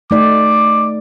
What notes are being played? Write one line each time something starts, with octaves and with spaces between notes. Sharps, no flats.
A3 D#4 D5 D6